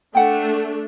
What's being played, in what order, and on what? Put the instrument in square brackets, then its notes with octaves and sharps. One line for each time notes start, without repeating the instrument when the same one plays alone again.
[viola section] A3 D4 [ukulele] F#5 G5